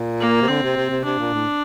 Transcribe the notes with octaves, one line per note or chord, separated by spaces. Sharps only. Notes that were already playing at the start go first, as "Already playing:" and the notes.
Already playing: A#2
A#3
C3
D3 C4
C3
C3
C3
C3 D4
A#2
A2